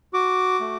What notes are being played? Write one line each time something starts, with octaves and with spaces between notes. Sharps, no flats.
F#4 D6
A3